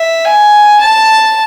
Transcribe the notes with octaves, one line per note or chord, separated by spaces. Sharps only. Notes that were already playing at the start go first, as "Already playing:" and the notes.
Already playing: E5
G#5
A5